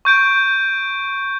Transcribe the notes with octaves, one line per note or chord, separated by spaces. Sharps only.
C#6 G6 D7